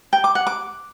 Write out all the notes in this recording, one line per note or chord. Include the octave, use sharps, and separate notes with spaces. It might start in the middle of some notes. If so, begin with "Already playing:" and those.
G5
D6
F#5
D6